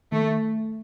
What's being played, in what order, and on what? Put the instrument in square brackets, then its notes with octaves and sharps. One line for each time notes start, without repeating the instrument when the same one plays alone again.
[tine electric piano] D#3 [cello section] A3